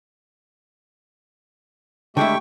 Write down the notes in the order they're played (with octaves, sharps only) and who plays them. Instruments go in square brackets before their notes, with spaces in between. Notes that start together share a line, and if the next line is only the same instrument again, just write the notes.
[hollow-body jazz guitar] D3 G#3 E4 [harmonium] A3 G4 E5 [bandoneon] G5 C#6